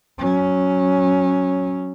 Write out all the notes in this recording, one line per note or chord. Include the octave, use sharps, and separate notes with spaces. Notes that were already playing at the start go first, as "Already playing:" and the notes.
F#3 C#4